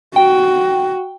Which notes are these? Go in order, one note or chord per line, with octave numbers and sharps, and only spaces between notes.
F#4 G5